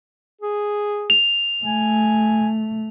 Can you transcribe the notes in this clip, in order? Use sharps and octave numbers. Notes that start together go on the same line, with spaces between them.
G#4
F7
A3 G#5